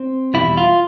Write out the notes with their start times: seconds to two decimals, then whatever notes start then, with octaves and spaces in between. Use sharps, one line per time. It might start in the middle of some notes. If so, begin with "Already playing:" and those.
Already playing: C4
0.34 E2 B2 G3 E4
0.57 F4